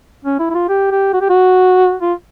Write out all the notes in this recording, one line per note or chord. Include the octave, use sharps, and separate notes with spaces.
C#4
E4
E4
F4
G4
G4
F#4
G4
F#4
F4